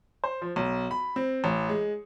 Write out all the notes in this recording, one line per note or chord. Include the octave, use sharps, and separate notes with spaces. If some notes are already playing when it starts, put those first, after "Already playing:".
C5
F3
B1
B5
C4
A1
G#3